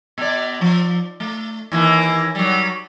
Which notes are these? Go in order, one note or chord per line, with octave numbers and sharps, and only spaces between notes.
B2 D5
F3
A3
D#2 E3 A#3
F#3 G3